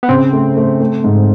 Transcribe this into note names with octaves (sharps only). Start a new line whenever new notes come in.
B3
C#3 C4
A3
A3
A3
G#2